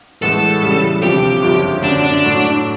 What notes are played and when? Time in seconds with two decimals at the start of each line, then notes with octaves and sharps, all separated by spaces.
0.22 A2 E3 G#3 B3 A4
0.62 C#3 E3 G3
1.02 D2 C3 F3 G4
1.42 G1 F#2 C#3 F3
1.83 F#2 D3 F#3 D4
2.04 D4
2.24 A2 F#3 A3